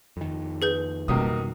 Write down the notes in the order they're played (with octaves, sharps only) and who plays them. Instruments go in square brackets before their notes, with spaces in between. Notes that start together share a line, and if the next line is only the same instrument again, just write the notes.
[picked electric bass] F2 D#3
[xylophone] G#4 B4 G6
[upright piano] C#2 A#3 D#6 [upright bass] B2 G3